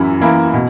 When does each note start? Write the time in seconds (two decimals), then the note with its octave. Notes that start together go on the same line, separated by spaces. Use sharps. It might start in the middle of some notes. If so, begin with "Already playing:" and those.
Already playing: F#2 E3 E4 B5
0.20 E3 A#3 E4
0.54 B2